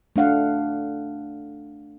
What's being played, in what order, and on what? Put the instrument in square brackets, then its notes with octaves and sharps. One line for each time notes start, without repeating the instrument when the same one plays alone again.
[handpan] A3 D4 F5 F#5